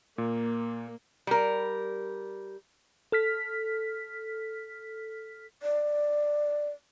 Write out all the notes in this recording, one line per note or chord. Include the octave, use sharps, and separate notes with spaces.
A#2 A#3
G3 A#4
A4 F6 B6
D5